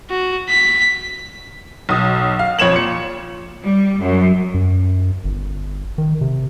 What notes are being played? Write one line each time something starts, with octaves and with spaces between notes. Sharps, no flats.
F#4
B6
B1 D#6
F5
F2 C#5 C#6 E7 F#7
A#2 C#7
G3
F#2
F#2
G1
D#3
C3